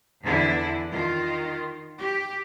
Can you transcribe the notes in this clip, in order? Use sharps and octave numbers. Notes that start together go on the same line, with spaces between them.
E2 D3 E3 E4
D#3 F4
G4